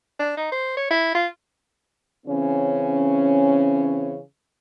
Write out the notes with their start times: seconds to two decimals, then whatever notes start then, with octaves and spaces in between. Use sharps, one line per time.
0.20 D4
0.37 D#4
0.52 C5
0.77 C#5
0.90 E4
1.15 F4
2.26 C#3 E3 C4 C#4